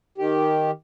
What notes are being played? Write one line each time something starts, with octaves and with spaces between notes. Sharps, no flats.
D#3 G4